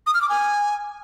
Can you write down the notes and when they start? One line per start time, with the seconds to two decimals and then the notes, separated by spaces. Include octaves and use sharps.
0.06 D#6
0.14 F6
0.22 D6
0.29 G#5